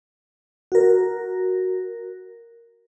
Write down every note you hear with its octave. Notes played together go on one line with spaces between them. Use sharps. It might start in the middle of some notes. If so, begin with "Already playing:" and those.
F#4 A#4